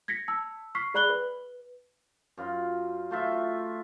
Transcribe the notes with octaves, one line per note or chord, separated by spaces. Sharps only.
G#6 A#6 B6 C#7
A5 E6
C#6 F6 B6 C7
G#4 D5 B5 F#6 F#7 G7
B4
F#2 F4
A3 F4 E5